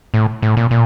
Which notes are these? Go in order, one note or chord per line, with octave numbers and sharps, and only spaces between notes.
A2
A2
A#2
A#2